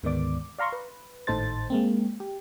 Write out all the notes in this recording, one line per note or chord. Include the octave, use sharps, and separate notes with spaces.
D2 G#2 D#3 B3 D5 D6
D5 F5 A#5 C6 C#6
B4
G#1 A2 D#4 A4 C5 A6
G#3 A#3 C4
G4